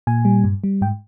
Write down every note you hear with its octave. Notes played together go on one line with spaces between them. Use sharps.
A#2 G#5
G3
G2
G3
G#2 G5